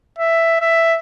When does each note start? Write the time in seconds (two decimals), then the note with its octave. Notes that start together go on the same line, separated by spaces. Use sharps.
0.19 E5
0.61 E5